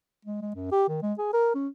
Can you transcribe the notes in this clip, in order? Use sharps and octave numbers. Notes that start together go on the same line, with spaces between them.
G#3
G#3
F#2
G4
D#3
G#3
G#4
A#4
C#4